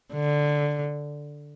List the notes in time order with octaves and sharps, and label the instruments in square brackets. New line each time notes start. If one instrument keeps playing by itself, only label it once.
[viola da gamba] D3